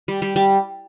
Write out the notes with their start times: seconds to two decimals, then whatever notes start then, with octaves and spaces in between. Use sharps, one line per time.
0.08 G3
0.22 G3
0.36 G3